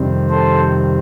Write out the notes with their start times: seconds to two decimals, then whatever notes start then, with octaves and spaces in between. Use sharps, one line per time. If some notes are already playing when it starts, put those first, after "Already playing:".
Already playing: F2 C3 D#3 G3 C4
0.30 A4 C5